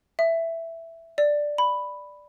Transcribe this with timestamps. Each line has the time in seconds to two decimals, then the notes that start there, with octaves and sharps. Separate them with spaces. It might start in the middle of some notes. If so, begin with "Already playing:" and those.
0.19 E5
1.18 D5
1.58 B5